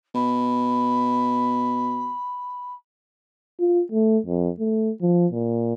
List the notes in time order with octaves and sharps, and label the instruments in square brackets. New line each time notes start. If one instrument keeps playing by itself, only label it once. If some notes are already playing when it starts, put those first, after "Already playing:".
[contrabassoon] B2 [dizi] B5
[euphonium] F4
A3
F2
A3
F3
A#2